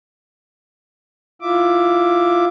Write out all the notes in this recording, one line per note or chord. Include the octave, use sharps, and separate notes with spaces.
E4 F4 E5 D6